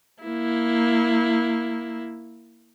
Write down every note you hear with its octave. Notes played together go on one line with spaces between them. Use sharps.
A#3 E4